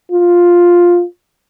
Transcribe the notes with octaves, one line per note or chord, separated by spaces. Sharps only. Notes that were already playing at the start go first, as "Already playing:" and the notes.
F4